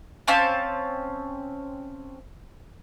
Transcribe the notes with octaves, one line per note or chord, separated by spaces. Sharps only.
C4 C#4 F5 A5